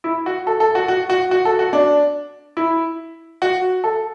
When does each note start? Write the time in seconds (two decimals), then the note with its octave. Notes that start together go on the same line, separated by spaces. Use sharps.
0.04 E4
0.26 F#4
0.47 A4
0.60 A4
0.75 F#4
0.88 F#4
1.10 F#4
1.31 F#4
1.45 A4
1.59 F#4
1.73 D4
2.57 E4
3.42 F#4
3.84 A4